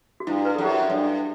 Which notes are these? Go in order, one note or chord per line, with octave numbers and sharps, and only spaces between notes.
F#4
G2 E4
B4
F#2 A4
G4
F#4
G2